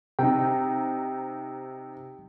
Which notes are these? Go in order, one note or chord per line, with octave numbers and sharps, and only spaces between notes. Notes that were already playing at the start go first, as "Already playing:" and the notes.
C3 D#4 G5